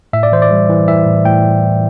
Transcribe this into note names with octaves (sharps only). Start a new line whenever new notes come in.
A2 E5
D5
E3 C5
D5
G3
E3
E3 E5
A2
A2 G5